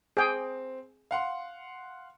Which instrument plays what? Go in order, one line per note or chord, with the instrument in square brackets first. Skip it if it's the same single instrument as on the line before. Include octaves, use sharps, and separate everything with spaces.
[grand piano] C4 [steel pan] G#4 G5
[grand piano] F5 F#5 C6